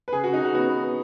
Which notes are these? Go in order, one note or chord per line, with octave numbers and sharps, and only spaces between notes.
B4
C#3 G#4
F#4
C#3
D#4
C#3 F#4
B3 F#4
B3
B3